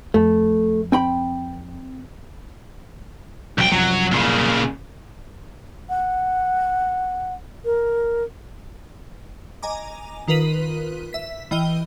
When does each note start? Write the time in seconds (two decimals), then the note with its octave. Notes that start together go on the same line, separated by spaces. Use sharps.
0.14 F2 A3
0.92 C4 G5 B5
3.58 E1 C2 F#3 G5
3.72 C2 F#2 F3 F#3
4.11 A#2 C#3
5.89 F#5
7.65 A#4
9.63 D#5 G#5 A#5 D6
10.28 D#3 F4 A#4 B4 B6 D#7
11.13 E5 B6
11.51 E3 D#5 G5 F6 D#7 G7